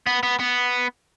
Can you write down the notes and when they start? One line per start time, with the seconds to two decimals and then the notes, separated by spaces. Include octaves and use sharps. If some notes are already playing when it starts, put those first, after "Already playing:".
0.06 B3
0.23 B3
0.40 B3